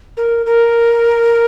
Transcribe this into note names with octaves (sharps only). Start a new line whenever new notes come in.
A#4
A#4